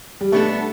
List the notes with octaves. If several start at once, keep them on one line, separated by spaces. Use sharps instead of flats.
G3
B2 A3 B3 D4 A4